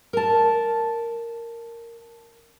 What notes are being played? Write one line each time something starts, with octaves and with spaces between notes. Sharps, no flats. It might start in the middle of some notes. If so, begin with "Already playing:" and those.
A#4 A5